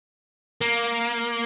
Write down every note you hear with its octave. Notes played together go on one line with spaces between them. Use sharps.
A#3